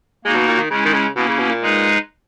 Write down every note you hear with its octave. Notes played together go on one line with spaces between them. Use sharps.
G#3 A#3 D#4 F#4
B2
A#2
D#3
C#3 G#3 C#4 E4
D#3
C#3
B2 A#3 C#4 E4
C#3
B2
A#2
G#3 D#4 G#4 B4